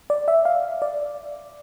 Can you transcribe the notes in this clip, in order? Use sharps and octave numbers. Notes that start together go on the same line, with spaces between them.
D5
E5
F5
D5